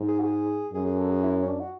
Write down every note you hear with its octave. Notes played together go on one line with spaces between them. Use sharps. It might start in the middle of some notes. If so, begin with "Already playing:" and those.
Already playing: G#2
G#4
F#4
G#4
F#2 G#4
G#4
A4
G#4
E4
C#4
D4
F#4